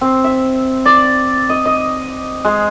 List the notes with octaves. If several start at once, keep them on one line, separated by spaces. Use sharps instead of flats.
C4
E5
D5
D#5
D#5
G#3